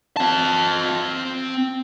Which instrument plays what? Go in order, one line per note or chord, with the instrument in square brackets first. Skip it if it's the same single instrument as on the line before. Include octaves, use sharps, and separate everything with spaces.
[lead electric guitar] C4 A5